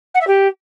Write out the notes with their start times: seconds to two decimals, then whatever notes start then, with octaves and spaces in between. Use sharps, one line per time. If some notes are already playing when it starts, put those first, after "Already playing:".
0.14 F#5
0.21 E5
0.27 G4